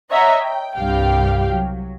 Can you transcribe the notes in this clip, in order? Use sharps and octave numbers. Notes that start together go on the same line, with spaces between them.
C#5 D#5 E5 F#5 A#5
G5
C2 G2 G4 F5 G5
F#3